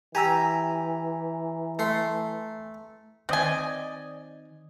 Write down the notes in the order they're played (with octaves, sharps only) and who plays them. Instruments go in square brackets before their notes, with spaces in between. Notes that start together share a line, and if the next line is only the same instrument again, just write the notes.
[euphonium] E3 [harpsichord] G4 [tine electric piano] G#5 A#5 E6
[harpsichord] A3 C6
[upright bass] D#3 [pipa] C4 G#5 [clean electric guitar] D5 D#5